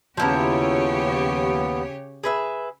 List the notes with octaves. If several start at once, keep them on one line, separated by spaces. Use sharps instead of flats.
D#2 C#3 F3 B3 E4 G4 C#5 A#5
G#4 B4 E5